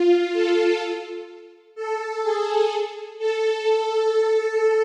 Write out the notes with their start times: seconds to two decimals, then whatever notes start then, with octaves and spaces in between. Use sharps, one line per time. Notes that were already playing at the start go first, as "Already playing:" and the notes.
Already playing: F4
0.33 A4
1.75 A4
2.23 G#4
3.18 A4